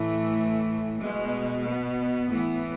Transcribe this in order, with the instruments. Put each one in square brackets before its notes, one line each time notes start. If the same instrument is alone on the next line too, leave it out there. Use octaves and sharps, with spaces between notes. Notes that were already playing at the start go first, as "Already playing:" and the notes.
Already playing: [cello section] A2 E3 A3
B2 G#3
B3
A2 E3